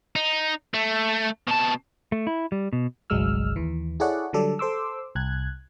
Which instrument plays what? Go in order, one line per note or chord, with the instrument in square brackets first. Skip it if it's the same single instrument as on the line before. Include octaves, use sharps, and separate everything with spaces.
[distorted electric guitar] D#4
A3
B2 A5
[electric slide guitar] A3
E4
G3
B2
[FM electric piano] G1 C2 F#3 G#3 E6 F6
D#2 E3
E4 G#4 A4 C#5 D5 F#5
D3 F#3 G3 A4 D5
A4 C5 C6 D6 E6
C2 F#6 G#6